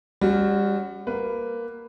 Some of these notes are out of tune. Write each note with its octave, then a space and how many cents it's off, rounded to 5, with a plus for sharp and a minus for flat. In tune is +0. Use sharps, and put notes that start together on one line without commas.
G3 +30 C#4 +0 F#4 +0
A#3 +0 B4 +10